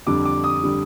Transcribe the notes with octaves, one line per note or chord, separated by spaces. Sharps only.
F2 D3 G3 D6
D6
D#6
D3 G3